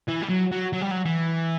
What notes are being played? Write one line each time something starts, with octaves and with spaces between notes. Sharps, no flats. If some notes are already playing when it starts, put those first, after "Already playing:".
E3
G3
F#3
F#3
F#3
G3
F#3
E3